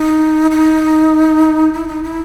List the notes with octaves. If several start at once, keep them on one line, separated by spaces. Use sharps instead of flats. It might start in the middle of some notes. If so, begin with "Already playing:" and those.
Already playing: D#4
D#4
E4
D#4
E4